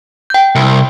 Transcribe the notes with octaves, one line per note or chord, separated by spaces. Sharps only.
G5 G6
C2